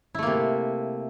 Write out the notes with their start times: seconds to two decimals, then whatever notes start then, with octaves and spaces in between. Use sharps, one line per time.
0.15 E4
0.19 A3
0.23 A#3
0.27 C3